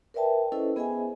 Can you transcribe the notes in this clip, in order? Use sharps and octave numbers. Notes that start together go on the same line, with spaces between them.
A#4 B4 D5 E5 G5 A5
C#4 E4 A4 B4 C5 D#5
B3 G#4 C5 D#5 E5 G#5